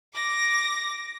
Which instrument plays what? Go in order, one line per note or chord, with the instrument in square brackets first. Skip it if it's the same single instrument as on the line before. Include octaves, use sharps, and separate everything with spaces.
[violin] D6 A#6